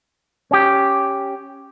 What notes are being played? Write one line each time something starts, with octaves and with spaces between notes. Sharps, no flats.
C#4 G4